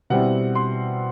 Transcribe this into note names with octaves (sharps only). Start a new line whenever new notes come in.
B2 G3 C4 E4 F#5
C6